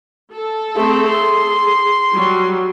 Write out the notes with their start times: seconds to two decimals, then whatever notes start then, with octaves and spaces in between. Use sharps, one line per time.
0.33 A4
0.76 A3 C4 G#4
1.09 C6
2.14 F#3 G3